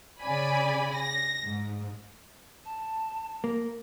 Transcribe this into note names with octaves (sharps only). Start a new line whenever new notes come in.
C#3 D5 G#5 B5
A#6
G#2
A5
A#3